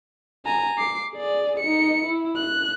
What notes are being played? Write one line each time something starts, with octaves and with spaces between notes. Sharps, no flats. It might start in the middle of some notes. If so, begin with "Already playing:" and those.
G#5 A#5
D6 C7
G#4 D5
D#4 C#7
E4
F#6